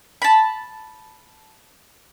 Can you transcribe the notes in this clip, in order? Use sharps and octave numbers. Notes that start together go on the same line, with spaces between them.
A5 B5